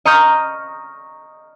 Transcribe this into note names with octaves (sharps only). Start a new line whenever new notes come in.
D#5 A#5 C#6 D#6 F6 G6